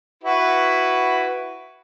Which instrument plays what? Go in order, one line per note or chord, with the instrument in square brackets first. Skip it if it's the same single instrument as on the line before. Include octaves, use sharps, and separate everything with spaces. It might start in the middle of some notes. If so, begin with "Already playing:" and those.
[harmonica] E4 F#4 B4